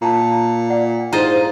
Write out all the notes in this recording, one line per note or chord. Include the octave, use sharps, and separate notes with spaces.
A#2 A5 A#5
D5 F#5
G#2 E4 F4 C5 D#5 A#5